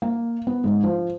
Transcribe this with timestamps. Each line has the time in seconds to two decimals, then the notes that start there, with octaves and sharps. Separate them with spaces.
0.02 A#3
0.47 B3
0.64 G#2
0.84 F3